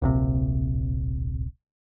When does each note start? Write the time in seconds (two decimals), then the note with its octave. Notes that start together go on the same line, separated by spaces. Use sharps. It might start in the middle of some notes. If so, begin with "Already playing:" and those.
0.02 D1 A#1 C3